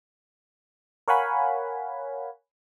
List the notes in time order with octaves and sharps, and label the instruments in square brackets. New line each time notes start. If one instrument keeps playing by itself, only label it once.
[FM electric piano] A#4 C#5 F5 F#5 G#5 B5